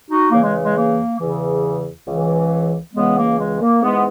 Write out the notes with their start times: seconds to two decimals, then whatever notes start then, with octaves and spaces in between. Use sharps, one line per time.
0.08 D#4 F#4
0.30 E2 C#3 E3 A#3
0.42 G#3
0.63 G#3
0.75 A#3
1.18 E2 C#3 E3
2.05 C#2 C#3 E3
2.93 C#2 C#3 E3 G#3 B3
3.16 A#3
3.38 G#3
3.60 A#3
3.81 G#2 E3 G#3 B3